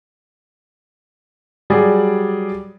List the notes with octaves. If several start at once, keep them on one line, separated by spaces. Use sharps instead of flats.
F#3 G3 G#4 D5